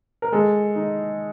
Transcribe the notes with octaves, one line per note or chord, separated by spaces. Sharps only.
A#4
G#3 A4
D#4